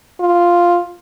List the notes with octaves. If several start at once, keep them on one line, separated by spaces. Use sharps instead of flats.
F4